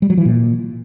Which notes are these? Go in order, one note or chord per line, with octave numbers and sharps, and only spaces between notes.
G3
F#3
E3
A#2